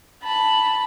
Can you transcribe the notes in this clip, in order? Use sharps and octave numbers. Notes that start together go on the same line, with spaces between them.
A5 B5